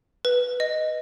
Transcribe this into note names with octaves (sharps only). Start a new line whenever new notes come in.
B4
D#5